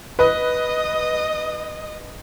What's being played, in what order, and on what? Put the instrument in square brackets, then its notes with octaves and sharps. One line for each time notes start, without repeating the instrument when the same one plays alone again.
[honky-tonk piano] B4 [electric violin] D#5